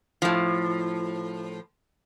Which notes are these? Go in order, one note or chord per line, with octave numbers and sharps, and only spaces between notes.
A2 F3